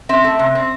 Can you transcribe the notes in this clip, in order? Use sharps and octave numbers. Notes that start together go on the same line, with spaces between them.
C4 E5
A3
C3
C4